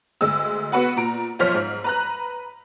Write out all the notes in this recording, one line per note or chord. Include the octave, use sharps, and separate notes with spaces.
D2 G#3 E6
B3 F#4 B4 F#5
A#2 A#5 D7
B1 F3 C5 C#5 F6 B6
G#2
B4 A#5 F#6